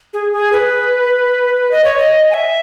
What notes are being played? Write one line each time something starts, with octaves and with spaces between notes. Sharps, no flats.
G#4
G#4
B4
D#5
C#5
D#5
G#5
E5